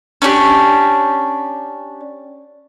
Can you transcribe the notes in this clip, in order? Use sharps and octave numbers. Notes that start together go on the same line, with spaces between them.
C#4 D4 F#4 G4